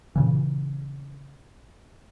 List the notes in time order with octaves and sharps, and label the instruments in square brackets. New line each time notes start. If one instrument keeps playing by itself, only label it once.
[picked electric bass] A#2 C#3 E3